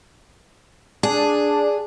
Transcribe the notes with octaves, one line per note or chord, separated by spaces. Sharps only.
D4 G#4